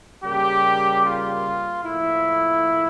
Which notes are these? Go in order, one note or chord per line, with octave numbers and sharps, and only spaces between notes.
C#3 G3 A#3 G4
F4
A2 F3 A#3 E4